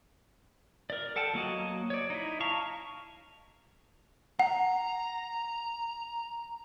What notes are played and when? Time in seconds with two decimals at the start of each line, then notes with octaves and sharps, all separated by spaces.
0.90 A#4 D5
1.16 A4 F#5 G5 A5
1.34 F#3 A#3 F#4 D#5
1.90 C#5 D5
2.10 D#4 E4
2.40 F5 A5 A#5 C#6
4.39 F#5 A#5